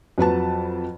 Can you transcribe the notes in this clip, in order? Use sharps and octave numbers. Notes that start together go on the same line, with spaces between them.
F2 F#3 B4 A5